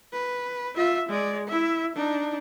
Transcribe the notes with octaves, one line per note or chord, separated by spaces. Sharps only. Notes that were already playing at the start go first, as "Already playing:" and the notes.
B4
F4 E5
G#3 D5
E4 E5
D4 D#4